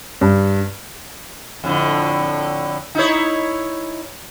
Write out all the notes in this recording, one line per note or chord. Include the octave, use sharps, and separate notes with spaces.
G2
F2 A2 D3
D#4 E4 C#5